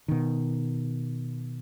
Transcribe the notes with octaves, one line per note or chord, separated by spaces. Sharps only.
B2 D#3